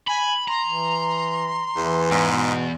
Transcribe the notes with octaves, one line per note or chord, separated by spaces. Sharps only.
G#5 B5
A#5 C6
E3
E2 E3
E2 G#2
B2